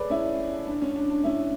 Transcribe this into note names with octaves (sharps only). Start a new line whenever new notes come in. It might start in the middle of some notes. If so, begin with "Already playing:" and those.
Already playing: G#4 A4 B4 C#5 D5
C#4 E4
D4
C#4
D4
D4
C#4 E4